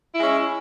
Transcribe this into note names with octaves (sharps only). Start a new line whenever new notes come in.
G#3 C#4 E4